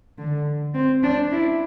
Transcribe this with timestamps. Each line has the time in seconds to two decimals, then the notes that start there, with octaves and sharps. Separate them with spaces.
0.18 D3
0.75 C4
1.03 D4
1.32 E4